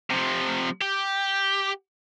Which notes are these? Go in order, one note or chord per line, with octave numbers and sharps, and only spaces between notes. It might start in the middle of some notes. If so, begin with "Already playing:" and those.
C3 F3
G4